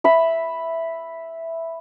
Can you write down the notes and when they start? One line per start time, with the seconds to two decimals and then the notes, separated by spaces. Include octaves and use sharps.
0.04 E5 B5